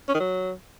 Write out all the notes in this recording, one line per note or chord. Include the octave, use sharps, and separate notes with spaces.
C#4
D#3
F#3